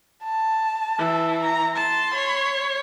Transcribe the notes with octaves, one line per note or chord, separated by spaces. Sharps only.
A5
E3
A#5
A5 C6
C#5